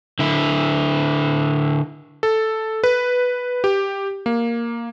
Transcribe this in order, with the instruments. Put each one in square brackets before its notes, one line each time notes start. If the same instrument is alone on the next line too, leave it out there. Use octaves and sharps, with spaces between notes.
[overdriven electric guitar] D3 E4
[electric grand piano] A4
B4
G4
A#3